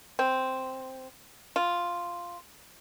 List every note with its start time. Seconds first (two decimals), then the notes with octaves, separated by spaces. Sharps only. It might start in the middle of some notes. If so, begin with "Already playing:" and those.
0.19 C4
1.56 F4